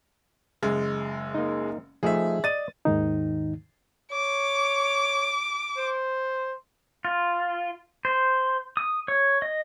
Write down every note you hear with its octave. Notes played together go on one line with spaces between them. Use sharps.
F#1 G#3
A#3 D#4
F3 A3 D#4 G#4 E5
D5 D#5 A6 D#7
D#2 G#2 D#3 D#4
C#5 D6
C5
F4
C5
D#6
C#5
D#5